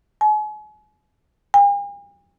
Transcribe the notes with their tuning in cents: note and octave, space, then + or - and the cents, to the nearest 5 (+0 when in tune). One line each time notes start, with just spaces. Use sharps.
G#5 +40
G#5 -45